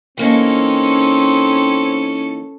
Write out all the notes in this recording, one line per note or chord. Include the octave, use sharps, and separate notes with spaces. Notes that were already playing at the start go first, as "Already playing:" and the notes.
E3 A#3 C4 C#4 D#4 A4